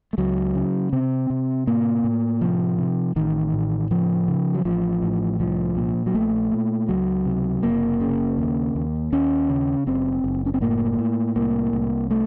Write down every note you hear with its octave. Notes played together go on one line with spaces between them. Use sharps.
A3
C#2 F#3
C#3
C3 C4
C3
A2 A#3
A2
C3 F3
C3
A1 D#3
A2
C#3 F3
C#3
F#3
A1 F3
A2
C2 F3
A#2
F#3
A#1 A3
A#2
C#2 F#3
C3
F#1 A#3
C#3
D#2
D#2
D#2 C#4
C#3
F#1 C4
F#1
C#4
C4
A2 A#3
A2
C2 A#3
C2
A3